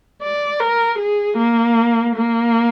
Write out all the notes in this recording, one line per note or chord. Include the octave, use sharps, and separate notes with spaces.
D5
A#4
G#4
A#3
A#3